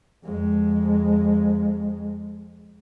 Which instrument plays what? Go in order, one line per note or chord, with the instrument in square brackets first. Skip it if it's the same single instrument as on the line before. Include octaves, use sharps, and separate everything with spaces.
[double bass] F2 G#3